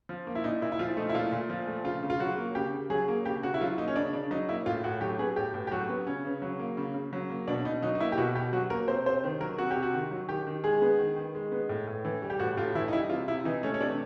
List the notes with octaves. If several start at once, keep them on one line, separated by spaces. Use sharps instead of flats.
F3
A#3
E4
A#2 D#4
A#2 E4
E4
F3 F4
A3 D#4
E4
A#2 F4
A#2
F3
A3
C#3 F4
C#3
F4
F#3 F#4
A#3
C#3 G4
C#3
F#3 G#4
A#3
C#3 G4
C#3 F#4
E4
F#3 F4
A#3 D#4
C#4
C#3 D4
C#3 D4
F#3 D#4
A#3 E4
A2 F4
A2 F#4
F#3 G4
B3 G#4
A2 G4
A2
G4
F#3 F#4
B3
C#3 C#4
C#3
F#3
A#3
C#3
C#3
F#3
A#3
B2 D4
B2 D#4
F#3 D#4
D#4
A#3 E4
G4
B2 F#4
B2 G4
F#3 F#4
A#3 A#4
C3 C5
C3 C5
D#3
F#3 A#4
C3 F#4
G4
C3
F#4
D#3
F#3
D#3 G4
D#3
G#3 G#4
B3
D#3
D#3
G#3
B3
A2
A2
E3
G3
G4
A2 F#4
A2 F4
E3 E4
D#4
G3 E4
C3 F4
C3 E4
E3 D#4
A3 C#4
C#4
C3 D4